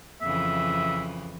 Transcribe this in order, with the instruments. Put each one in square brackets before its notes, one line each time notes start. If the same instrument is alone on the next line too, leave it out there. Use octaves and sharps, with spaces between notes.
[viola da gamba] F2 C#3 E3 [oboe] E5